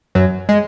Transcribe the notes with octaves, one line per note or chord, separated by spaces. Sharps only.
F#2 F#3
G#3